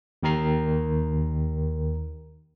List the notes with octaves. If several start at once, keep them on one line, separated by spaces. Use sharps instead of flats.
D#2 D#3 A#4 A#5 C7